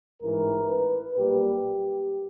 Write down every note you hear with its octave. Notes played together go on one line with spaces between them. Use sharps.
A1 G#2 E3 A#4
B4
B1 A#2 G3 A#3 G4